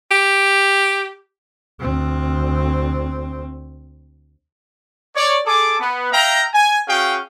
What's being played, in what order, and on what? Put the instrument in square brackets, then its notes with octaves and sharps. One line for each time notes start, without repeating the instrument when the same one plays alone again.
[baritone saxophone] G4
[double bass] D2 C4
[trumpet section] C#5 D5
G#4 A4 A5 D6
B3
E5 F5 G5 A#5
G#5
C#4 F#4 G#4 F5 G5